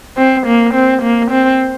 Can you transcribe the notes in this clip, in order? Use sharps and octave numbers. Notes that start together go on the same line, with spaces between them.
C4
A#3
C4
A#3
C4